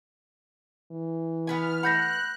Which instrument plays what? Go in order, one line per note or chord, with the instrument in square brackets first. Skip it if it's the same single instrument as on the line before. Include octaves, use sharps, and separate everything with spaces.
[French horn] E3
[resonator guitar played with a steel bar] B3 B4 G#5 [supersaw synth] F6
[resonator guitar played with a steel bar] A3 B4 F#5 [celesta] B5 G6 A#6 [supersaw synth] F#6